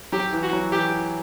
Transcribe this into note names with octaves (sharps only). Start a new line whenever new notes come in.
F#3 G4
E3
F#4
F#3
E3 G4